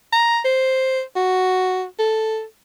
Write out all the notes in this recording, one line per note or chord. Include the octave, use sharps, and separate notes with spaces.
A#5
C5
F#4
A4